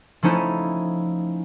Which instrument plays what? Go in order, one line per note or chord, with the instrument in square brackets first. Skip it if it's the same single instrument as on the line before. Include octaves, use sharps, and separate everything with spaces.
[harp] F3 A3 C#4 D#4 E4